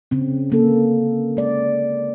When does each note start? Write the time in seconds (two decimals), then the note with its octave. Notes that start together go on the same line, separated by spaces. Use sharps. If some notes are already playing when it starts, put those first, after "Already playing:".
0.11 C#3 C4
0.50 D3 A#3 A4
1.37 G#3 D5